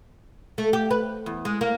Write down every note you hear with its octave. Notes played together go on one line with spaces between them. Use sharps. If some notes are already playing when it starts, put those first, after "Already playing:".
A3
G4
B4
E2
G#3
A#3